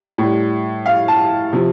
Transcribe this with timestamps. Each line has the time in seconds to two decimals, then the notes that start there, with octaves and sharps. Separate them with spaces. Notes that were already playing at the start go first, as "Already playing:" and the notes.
0.18 A2 G3
0.86 F5
1.08 A5
1.53 C3 F3